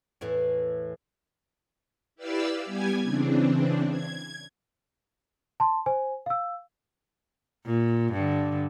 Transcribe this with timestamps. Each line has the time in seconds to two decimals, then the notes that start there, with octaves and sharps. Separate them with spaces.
0.21 E2 A2 E3
2.16 E4 G4 B4 D5 F5 E6
2.65 G3 B3 G4 G#5 G#6
3.03 C#3 E3 C4 D4
3.89 G#6
5.60 A5 C6
5.86 C5 G#5
6.26 F5 E6
7.65 A#2
8.13 G2 D3